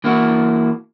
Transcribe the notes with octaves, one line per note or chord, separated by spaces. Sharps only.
E3 A#3 E4 F#4